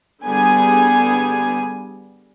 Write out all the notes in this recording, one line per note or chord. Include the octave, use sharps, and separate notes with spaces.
D3 G3 B3 G#4 G#5